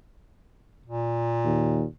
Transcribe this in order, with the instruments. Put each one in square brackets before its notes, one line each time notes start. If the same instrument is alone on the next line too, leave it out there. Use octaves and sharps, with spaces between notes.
[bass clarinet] A#2
[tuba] D#2